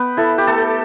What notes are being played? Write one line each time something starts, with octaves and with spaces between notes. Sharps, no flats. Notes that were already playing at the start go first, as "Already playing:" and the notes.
Already playing: B3 B4 G5
E4 A4
G4
A3 A4